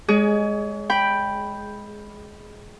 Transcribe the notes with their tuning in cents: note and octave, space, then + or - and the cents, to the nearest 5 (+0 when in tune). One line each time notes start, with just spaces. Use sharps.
G#3 +0 G#4 +15 C#5 +35
G5 +5 B5 +0